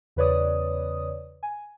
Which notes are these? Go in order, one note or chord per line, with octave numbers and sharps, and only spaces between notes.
E2 C#3 B4 C#5 D5 D#6
G#5